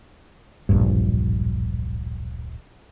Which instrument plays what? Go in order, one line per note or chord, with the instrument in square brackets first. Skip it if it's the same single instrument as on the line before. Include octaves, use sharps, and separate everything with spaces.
[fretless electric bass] D1 A#1 G2